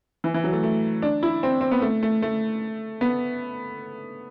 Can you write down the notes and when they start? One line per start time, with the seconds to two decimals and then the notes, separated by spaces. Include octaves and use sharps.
0.24 E3
0.34 E3
0.44 F#3
0.53 A3
0.63 A3
1.02 D4
1.23 E4
1.43 C4
1.61 C4
1.71 B3
1.82 A3
2.03 A3
2.22 A3
3.01 B3